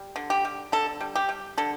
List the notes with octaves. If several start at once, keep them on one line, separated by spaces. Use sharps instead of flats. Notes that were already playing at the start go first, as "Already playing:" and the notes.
Already playing: G3
D3
G4
G3
D3 A4
G3
G4
G3
D3 A4